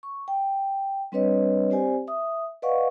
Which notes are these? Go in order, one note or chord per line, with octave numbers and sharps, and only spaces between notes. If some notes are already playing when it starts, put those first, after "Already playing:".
C#6
G5
G3 C4 D4 B4 C#5 D#5
C4 G4 C5 D5 G#5
E5 D#6
B4 D5 D#5 F5 F#5 C#6